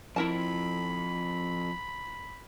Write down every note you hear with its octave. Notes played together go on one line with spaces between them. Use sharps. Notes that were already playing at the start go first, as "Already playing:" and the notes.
F2 E4 A#4 A5 B5